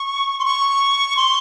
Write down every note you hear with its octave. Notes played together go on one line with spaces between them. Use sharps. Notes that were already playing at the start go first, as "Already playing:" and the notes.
Already playing: C#6
C6
C#6
C6